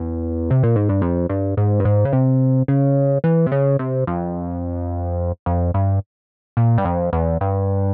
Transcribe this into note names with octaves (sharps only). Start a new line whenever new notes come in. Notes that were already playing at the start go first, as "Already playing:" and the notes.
Already playing: E2
C3
A#2
G#2
G2
F2
G2
G#2
G2
G#2
C#3
C3
C#3
E3
C3
C#3
C3
F2
F2
G2
A#2
G2
F2
E2
G2